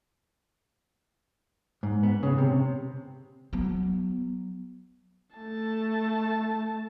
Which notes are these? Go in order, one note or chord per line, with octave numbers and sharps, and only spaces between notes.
G#2
B3
C#3
C3
F#3 B3
A3 A5